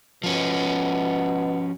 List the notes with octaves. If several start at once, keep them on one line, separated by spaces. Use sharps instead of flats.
B2 F3 C#4